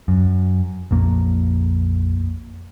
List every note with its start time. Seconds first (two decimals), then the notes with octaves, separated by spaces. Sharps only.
0.08 F#2
0.91 A#1 F2 A#3